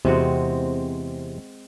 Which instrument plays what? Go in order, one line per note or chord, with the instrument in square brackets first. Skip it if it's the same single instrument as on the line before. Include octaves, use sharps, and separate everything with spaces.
[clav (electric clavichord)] E2 C3 [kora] G#3 C4 F#4